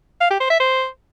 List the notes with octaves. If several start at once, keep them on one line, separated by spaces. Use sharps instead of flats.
F5
G4
C5
E5
C5